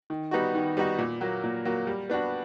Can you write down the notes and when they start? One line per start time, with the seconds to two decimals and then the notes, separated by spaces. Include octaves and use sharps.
0.10 D#3
0.31 G3 B3 D#4 F#4
0.55 D#3
0.77 G3 B3 D#4 F#4
0.98 A#2
1.21 F#3 A#3
1.44 A#2
1.65 F#3 A#3
1.87 G3
2.10 B3 D4 F#4